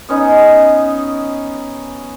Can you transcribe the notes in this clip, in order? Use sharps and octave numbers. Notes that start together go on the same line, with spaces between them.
B3 C#4 D#4